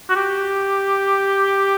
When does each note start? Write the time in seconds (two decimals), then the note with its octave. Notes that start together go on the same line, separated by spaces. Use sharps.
0.10 F#4
0.16 G4